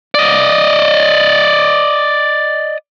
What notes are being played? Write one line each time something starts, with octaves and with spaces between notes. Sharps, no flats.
D5 D#5